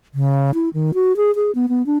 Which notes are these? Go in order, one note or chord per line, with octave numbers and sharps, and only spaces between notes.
C#3
E4
D#3
F#4
G#4
G#4
B3
B3
D4